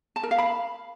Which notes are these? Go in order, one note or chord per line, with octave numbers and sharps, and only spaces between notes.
A5
A#4
F5
B5